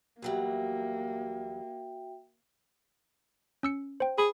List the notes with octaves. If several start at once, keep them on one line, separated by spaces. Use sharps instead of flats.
E2 F#3 G3 A#3 F#4 E5 G5
C#4 E6 C#7
C5 G5
G#4 B5